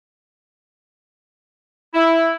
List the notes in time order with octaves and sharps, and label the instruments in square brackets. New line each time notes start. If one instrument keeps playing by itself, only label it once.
[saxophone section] E4